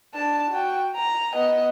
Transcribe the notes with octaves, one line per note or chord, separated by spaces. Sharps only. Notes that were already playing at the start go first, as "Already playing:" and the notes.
D4 A5
F#4 G5
A#5
B3 D#5